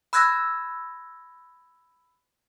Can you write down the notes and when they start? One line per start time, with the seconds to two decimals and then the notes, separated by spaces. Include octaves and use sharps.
0.13 B5 E6 F#6 G#6 A#6